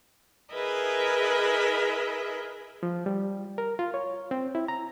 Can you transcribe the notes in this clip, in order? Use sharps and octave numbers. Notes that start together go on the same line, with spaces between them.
E4 G#4 A#4 B4 D#5 E5
F3
G3
A#4
F4
C#5
C4
E4
A#5